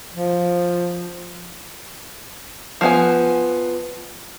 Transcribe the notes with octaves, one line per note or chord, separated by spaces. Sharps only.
F3
F3 B3 G#5